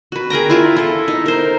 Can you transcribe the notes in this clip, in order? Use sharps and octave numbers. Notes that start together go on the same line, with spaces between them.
F#4 B4
G#4 A#4 G5 A#5
E4 F4 A5
E4 A4
D#4
A#4 C5